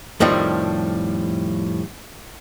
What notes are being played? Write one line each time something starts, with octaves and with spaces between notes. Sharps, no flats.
F2 A2 D#3 F3 G3